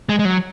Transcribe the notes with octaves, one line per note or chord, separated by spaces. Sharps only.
G#3
G#3
F#3